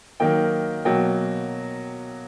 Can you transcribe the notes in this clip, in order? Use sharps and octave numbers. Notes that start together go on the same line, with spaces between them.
D#3 F#3 A#3 G5
B2 F#3 A#3 G5